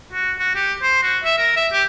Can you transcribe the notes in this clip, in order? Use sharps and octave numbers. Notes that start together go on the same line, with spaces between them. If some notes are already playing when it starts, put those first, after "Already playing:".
F#4
F#4
G4
C5
F#4
E5
A#4
E5
G4